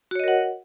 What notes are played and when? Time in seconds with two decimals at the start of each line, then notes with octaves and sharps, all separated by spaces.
0.11 F#4
0.15 C#5
0.20 D#5
0.24 A#4
0.28 F#5